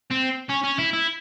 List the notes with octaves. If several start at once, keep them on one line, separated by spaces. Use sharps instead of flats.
C4
C#4
C#4
E4
E4